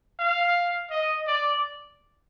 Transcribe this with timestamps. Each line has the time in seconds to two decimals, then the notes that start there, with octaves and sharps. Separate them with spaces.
0.19 F5
0.91 D#5
1.27 D5